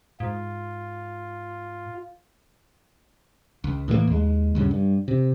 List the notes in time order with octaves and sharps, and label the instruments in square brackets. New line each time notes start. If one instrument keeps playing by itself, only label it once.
[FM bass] G#2 [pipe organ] F4
[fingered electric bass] C#2
A2 E3 G3 A#3
D#2 G#3
D2 G2 C#3
G2
C3